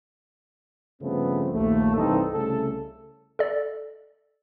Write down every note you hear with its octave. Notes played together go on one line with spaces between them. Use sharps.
G2 C#3 F3 A3 B3 C4
A#1 D#2 A3
C2 G2 E3 C4 D#4 A4
C2 C#3 A3 A4
A4 D5